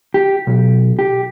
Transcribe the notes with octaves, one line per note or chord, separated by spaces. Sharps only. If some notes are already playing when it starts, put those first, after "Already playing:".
G4
B1
G4